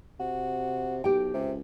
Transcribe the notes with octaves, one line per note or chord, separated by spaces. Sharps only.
C3 F#4
B1 G4 G5
C#2 C3